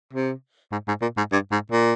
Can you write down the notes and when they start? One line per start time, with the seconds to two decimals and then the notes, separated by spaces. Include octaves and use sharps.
0.13 C3
0.72 G#2
0.88 G#2
1.02 A#2
1.17 G#2
1.32 G2
1.52 G#2
1.71 A#2